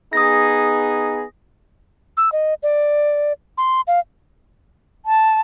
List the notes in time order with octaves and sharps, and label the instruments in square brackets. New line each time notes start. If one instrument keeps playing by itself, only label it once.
[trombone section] B3 D#4 G#4 [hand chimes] D#6 A#6
[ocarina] E6
D#5
D5
C6
F5
[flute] A5